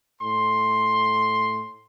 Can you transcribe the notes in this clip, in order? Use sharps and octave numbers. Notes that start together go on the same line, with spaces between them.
A2 C6